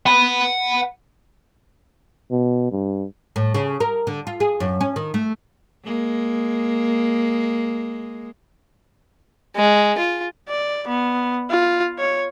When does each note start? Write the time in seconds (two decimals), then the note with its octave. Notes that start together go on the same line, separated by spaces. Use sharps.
0.06 F#5 B5
2.31 B2
2.71 G2
3.36 A2
3.54 C#3
3.80 A#4
4.07 D3
4.27 F4
4.40 G#4
4.60 F#2
4.81 C#4
4.96 D#3
5.14 A3
5.85 G#3 A#3
9.56 G#3
9.98 F4
10.49 D5
10.87 B3
11.51 F4
11.98 C#5